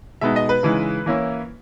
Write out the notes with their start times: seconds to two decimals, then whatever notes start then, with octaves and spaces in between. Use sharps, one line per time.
0.21 B2 G#3 B3 D#4 E5
0.36 D#5
0.49 B4
0.63 C#3 E3 G#3 D#4
1.06 E3 A#3 C#4 E4